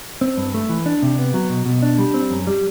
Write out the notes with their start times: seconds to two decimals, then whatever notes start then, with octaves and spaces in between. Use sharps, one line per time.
0.21 C4
0.37 G2
0.54 A3
0.69 E3
0.86 D4
1.03 C3
1.18 B3
1.34 F#3
1.50 B2
1.66 B2
1.82 D4
1.98 G3
2.14 C4
2.31 F#2
2.47 G3